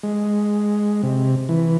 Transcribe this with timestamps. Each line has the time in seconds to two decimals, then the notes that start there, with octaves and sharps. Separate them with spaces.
0.03 G#3
1.03 C3
1.49 E3